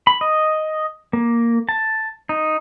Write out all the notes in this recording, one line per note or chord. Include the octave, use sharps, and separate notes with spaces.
B5
D#5
A#3
A5
D#4